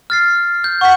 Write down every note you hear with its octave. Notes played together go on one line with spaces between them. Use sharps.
F6 A6 C7
G6
F#5 C#6 B6